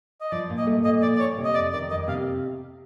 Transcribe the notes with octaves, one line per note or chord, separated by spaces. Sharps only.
D#5
F3 D5
A#2
D#5
A3
A#2 D#5
F3 D5
D5
A#2 C#5
C3
D#5
F2 D5
D#3 D5
F2 D#5
C3 F5